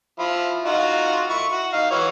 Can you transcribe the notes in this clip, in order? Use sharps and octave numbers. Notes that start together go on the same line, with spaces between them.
F3 E4 F4
D#4 F4 F#4
E4 C#6
F#4
D#4 F5
E3 F#4 C#5